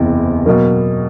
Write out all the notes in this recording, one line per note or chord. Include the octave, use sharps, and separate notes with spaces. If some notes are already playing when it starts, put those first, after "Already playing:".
Already playing: F#1 E2 C3 E3
B2 F#3 A#3